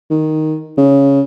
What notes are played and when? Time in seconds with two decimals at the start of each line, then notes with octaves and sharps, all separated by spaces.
0.10 D#3
0.77 C#3